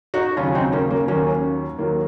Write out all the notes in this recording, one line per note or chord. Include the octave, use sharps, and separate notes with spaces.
D#4 F#4
D#2 C#3 F#3 C#4 F4
C4 D#4
A#3 C#4
A#3
D#2 D#3 F#3 A#3 C#4
D#2 D#3 F#3 A#3